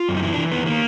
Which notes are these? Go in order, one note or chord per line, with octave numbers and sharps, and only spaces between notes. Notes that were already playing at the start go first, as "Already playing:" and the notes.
Already playing: F4
F#2
D#4
E3 E4
E3 D4
D#3 B3
D#3 A#3